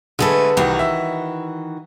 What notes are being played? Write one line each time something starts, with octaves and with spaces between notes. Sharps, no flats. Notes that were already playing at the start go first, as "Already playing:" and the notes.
D3 G#3 A3 G#4 A4 B4
C2 D#3 E3 F#4
E5